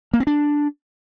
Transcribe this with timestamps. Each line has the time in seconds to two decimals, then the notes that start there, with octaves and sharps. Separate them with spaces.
0.14 A#3
0.20 C4
0.27 D4